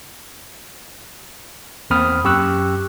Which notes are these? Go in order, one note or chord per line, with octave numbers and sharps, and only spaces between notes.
E2 A#3 C4 B5 D#6 F6
F#2 G4 C#6 E6 F#6